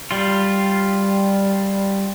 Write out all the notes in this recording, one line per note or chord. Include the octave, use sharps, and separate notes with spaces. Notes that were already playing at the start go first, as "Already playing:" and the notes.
G3 F4